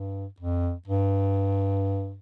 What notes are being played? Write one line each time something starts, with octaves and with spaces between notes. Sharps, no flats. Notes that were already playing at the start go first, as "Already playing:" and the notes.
Already playing: G2
F2
G2